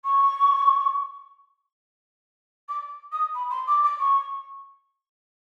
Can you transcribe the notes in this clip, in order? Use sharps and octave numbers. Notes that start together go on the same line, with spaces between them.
C#6
D6
D#6
B5
C6
D6
D6
C#6